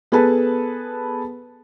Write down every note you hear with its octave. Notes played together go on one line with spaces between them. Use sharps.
B3 G#4 A4 B4 A5 B5